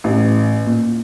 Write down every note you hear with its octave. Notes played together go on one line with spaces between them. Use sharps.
A1
A#2